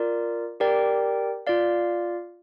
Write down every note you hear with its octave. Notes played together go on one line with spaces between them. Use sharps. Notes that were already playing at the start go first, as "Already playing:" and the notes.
Already playing: F4 A#4 D5
G4 A#4 D5 G5
F4 D5 F5